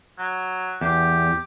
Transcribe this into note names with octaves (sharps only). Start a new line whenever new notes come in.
F#3
E2 G4